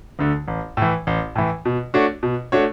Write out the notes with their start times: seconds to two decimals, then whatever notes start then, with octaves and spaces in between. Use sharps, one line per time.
0.19 D2 D3 A3
0.48 A1
0.77 A2 E3
1.07 A1
1.36 A2 E3
1.65 B2
1.94 A3 D4 F#4 C#5
2.23 B2
2.52 A3 D4 F#4 C#5